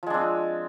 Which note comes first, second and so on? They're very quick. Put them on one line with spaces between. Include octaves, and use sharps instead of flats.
F3 G#3 D4 C4